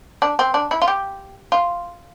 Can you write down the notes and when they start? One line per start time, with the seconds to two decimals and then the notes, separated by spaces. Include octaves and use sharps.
0.22 D4
0.39 C4
0.54 D4
0.71 E4
0.82 F4
0.88 G4
1.52 F4